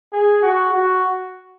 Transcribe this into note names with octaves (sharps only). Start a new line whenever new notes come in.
G#4
F#4
F#4